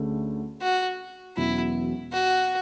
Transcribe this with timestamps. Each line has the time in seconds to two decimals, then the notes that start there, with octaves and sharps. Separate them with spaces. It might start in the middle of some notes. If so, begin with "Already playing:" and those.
Already playing: D2 D3 A3 C#4 G#4
0.62 F#4
1.37 E1 E2 B2 F#3 C#4 E4
2.12 F#4